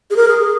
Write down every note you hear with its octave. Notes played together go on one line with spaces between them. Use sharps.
G#4
A#4
G#4
G#4